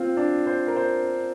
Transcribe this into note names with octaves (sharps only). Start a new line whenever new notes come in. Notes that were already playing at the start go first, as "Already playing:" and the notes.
Already playing: C4 F4
D4
C5
A#4
C5